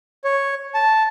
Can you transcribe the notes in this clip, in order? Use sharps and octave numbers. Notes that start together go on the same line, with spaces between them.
C#5
A5